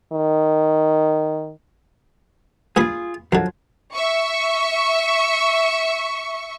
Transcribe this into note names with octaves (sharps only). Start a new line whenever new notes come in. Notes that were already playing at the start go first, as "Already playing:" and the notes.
D#3
G2 A#2 F4 G#4 B5
F#2 D3 F3 F#3
E5 C#6